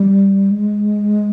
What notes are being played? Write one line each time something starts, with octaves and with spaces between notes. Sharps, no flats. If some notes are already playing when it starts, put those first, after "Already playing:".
Already playing: G3
G#3